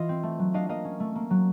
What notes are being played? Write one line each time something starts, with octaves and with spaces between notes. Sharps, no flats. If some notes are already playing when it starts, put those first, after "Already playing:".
Already playing: E3 F4 D#5 F5
C4
A3
F#3
D4 D#5 F5
A#3 D#5 F5
C#4
A3
A#3
F#3